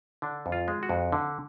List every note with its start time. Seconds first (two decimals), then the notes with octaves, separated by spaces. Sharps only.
0.22 D3 D4
0.46 F2
0.52 F4
0.68 G#3
0.83 F#4
0.89 F2
1.12 D3